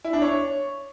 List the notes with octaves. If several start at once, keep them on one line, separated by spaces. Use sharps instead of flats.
E4
D4
C#5